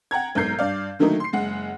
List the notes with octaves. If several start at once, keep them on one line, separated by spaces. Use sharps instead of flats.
F#5 G5 A#5 G#6
B1 G#2 A#4 G6 C7
G2 D5 F5
D3 D#3 F#3 A3 A#3 D#4
C6 C7
F#1 G#3 F#5